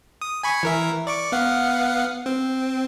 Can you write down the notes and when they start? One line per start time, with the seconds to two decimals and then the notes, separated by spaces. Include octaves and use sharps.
0.21 D#6
0.43 G#5 B5 C#6
0.63 E3 A#4 E5
1.07 D5 C#6 D6
1.32 B3 F5 F#5
2.26 C4